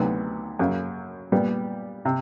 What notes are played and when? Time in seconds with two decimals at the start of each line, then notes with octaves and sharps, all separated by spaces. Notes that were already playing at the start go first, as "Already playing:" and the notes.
Already playing: D2 C3 D#3 F#3 B3
0.59 F#2 C#3 F#3 A#3
1.32 A#2 G3 B3
2.05 C3